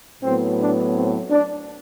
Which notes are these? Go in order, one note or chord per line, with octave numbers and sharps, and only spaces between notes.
A2 F#3 B3 C4
D4
C4
D4